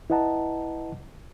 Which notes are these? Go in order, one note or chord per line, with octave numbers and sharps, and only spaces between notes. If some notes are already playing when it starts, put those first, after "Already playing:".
E4 B4 D#5 F#5 A5 A#5